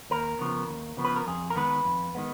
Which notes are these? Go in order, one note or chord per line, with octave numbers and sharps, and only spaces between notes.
D#2 A#4
C#3 F3 B3
D#2
C#3 F3 B3
B4
A#4
F2 G#4
A#4
D#3 G#3 B3 B4
F2
D#3 G#3 B3